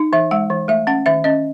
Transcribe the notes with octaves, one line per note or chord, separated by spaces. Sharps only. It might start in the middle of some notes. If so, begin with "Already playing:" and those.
Already playing: D#4
E3 E5
G#3 F#5
E3
A3 E5
C#4 F#5
D#3 E5
C#4 D#5